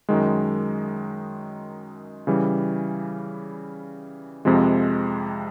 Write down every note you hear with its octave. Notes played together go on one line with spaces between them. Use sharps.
F#2 D#3 G#3
C#3 E3 G3
F2 C3 F3 G#3